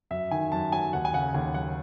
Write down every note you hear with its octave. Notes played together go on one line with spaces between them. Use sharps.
F#2 E5
D#3 G#5
F#2 A5
F#3 G#5
D#2 F#5
G#5
C#3 F#5
D#2 G#5
F#3 F#5